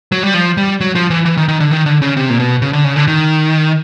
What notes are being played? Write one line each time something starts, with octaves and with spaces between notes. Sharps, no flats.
F#3
G3
F3
G3
F#3
F3
E3
E3
D#3
D#3
D3
D#3
D3
C#3
C3
A#2
B2
C#3
D3
C#3
D3
D#3